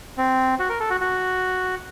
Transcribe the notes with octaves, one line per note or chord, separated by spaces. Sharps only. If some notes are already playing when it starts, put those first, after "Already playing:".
C4
F#4
A#4
A4
F#4
F#4